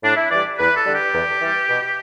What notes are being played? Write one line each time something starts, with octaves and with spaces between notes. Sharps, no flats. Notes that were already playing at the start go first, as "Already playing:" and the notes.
A2 D4
E4
E3 G3 D5
E2 B4
A4
D3 G3
G4
E2
E3 G3
B2